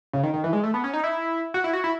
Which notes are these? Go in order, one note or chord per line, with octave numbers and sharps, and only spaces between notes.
C#3
D#3
D#3
E3
G#3
A3
B3
C#4
D#4
E4
F#4
E4
F#4
E4